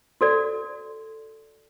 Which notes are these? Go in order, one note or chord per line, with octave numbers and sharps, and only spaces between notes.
F#4 A4 D5